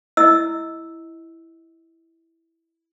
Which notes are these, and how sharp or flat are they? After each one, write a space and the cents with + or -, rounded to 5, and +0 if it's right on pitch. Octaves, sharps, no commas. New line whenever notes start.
E4 +0 D#5 +25 E6 +0